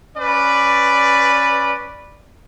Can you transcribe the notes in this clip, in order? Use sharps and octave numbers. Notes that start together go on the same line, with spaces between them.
C#4 B4 D5